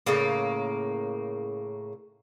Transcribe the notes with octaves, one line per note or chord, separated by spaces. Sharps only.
A2 C#3 A#3